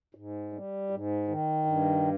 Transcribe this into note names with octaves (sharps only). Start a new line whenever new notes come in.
G#2
G3
G#2
D#3
G2